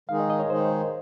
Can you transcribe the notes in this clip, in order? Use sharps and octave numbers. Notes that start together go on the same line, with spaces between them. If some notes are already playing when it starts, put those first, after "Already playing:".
D#3 G#3 D#4 G#4 F5
D#5
D#5
C#5
D#3 G#3 D#4 G#4 C5